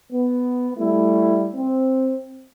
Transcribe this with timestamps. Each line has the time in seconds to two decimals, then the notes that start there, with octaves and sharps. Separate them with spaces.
0.11 B3
0.78 G3 A3 E4
1.55 C4